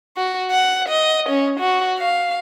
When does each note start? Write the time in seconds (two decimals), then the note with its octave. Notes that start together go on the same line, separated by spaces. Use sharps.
0.17 F#4
0.51 F#5
0.89 D#5
1.29 C#4
1.60 F#4
1.99 F5